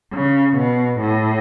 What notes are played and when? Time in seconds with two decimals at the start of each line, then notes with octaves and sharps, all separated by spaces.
0.13 C#3
0.57 B2
1.01 A2